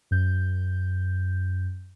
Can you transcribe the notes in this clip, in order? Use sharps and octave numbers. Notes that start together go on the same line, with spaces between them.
F#2 G6